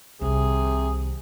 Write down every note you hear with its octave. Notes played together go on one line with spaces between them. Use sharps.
C2 C3 D#3 G#4